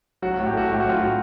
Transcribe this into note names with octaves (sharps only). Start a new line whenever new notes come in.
F#3 F#4
F#4
A2
G4
A3 F#4
A2 G4
F#4
F#3 F4
A2 F#4